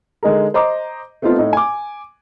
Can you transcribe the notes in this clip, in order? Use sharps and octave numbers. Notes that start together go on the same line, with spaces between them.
D3 G#3 D#4 G#4 A#4
C5 D#5 A#5 D6
A3 B3 C4 D#4 F4
A2 D#4
G#5 D6